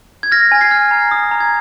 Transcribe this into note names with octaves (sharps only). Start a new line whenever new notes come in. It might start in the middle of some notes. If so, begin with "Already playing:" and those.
G#6
F6 A#6
G#5
G#6 C7
F6
A#5
D#6
A#5
G#6